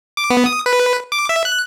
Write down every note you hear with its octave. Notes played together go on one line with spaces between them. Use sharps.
D6
B3
D#6
B4
D6
E5
F#6